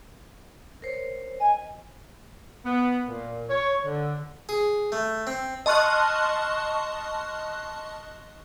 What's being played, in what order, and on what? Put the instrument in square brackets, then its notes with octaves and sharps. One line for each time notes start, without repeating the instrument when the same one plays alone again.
[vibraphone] A#4 C5 C#5
[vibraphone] D#5 [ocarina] G#5
[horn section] B3
A#2
C#5
D3
[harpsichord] G#4
A3
C4
[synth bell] D#5 A5 C6 C#6 F6 F#6